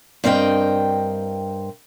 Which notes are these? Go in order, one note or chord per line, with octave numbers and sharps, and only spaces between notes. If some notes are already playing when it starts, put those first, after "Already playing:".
G2 C4 A#4 D#5 G5